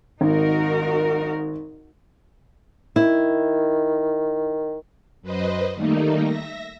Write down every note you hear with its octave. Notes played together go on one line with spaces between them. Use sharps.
G#1 D#4 F#4 A#4
D#3 E4
F#2 B4 C5 D#5
D#3 G3 A3 A#3 D#4
E5 A#6